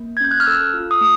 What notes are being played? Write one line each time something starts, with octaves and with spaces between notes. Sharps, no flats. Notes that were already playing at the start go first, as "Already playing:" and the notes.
Already playing: A#3
G#6
C#4 G6
F#6
F6
A4 E6
F4
D#6
A3